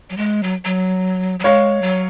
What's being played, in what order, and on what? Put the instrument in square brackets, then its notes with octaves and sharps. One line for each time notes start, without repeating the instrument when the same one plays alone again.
[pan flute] F#3
G#3
F#3
F#3
F#3
[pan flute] G#3 [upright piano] C#5 F5
[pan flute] F#3